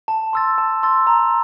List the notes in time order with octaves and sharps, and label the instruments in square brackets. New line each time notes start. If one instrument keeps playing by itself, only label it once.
[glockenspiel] A5
C6 E6 A6
A5
C6 E6 A6
A#5